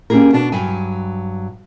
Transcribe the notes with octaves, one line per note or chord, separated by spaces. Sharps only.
A#3 C#4 D4 G4 G#4 A#4
B2 B3 D4 F#4
G2 F#3 G#5